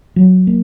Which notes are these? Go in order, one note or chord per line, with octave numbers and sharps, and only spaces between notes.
F#3
A#3